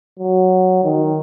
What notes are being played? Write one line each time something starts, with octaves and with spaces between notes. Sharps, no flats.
F#3
D#3